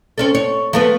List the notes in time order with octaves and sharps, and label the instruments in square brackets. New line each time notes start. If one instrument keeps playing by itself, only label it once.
[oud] C4 C#4 A4
C#5
F3 A3 B3